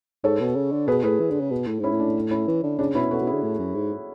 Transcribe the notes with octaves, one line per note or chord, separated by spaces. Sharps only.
G#2 A4 C#5
B2
C#3
D3
B2 G#4 B4
A2 G#4 B4
E3
D3
C#3
B2
A2
G#2 C#4 E4
A2
D4
C#4 E4
E3
D3
C#3 D4
B2 C#4 E4
B2 F#4 A4
B2
E4 G#4
D3
A2
F#2
G#2